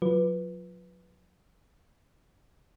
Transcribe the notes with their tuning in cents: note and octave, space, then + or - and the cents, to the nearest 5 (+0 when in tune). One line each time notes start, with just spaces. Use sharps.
F#3 -40 F4 +0 B4 +0